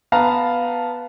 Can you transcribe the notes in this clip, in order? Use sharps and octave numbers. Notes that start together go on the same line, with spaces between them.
B3 F5 A5 A#5